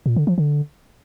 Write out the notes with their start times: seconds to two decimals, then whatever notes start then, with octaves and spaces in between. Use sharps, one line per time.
0.06 A#2
0.16 D3
0.27 F3
0.38 D3